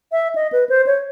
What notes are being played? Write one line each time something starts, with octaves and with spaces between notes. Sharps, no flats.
E5
D#5
B4
C5
C#5